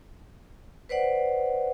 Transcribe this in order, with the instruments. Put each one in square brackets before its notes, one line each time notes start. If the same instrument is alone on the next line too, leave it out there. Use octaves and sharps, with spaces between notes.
[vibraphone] B4 C5 D5 F#5